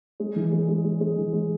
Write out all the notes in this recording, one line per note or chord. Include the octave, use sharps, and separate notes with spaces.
G#3
E3
G#3
G#3
G#3
G#3
E3
G#3